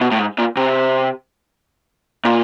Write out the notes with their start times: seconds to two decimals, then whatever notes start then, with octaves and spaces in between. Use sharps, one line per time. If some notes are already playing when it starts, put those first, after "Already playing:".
0.01 B2
0.11 A2
0.19 G#2
0.38 A#2
0.57 C3
2.25 A#2